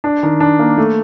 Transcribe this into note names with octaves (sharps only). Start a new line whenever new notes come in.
D4
D#3
D4
A#3
A3